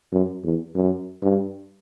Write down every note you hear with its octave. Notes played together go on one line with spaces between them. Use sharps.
F#2
E2
F#2
G2